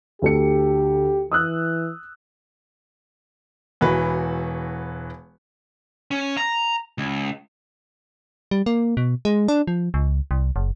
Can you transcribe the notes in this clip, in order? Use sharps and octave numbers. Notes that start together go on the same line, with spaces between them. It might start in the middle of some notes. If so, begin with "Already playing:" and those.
D2 G4 A4 C#7
E3 D#6 E6 F#6
E1 E3 F#4 B4
C#4
A#5
C#2
G3
A#3
B2
G#3
D4
F3
C#2
C2
F#1